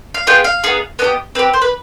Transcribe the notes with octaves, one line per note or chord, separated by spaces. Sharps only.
F5
B3 F4 G#4 G5
F5
B3 D#4 G#4
B3 D4 G4 D#5
C4 G4 B4
C5
B4